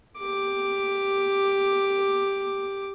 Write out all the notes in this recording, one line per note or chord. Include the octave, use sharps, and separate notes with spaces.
G4 D6